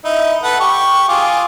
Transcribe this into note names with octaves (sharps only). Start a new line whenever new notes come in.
D#4 E4
A4 B4 F#5
G4 C#6
F4 G#4 D6